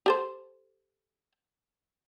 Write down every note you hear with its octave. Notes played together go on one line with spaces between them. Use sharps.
G4 A4 C5